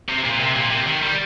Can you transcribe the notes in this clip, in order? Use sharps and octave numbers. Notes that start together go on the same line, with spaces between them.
C3
A#2
C3
A#2
C3
D#3
G3